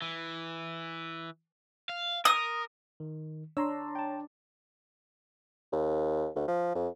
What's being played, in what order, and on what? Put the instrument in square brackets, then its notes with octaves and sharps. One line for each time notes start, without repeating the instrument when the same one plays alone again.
[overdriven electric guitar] E3
F5
[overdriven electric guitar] A#4 [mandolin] D#6
[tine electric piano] D#3
[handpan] D4 [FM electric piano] C#5 A#5 C6 [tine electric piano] E6
[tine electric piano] G5 A5
[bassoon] D#2
D2
F3
F2